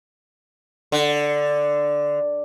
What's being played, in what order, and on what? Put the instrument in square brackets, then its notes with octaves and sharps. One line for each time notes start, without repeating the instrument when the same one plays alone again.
[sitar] D3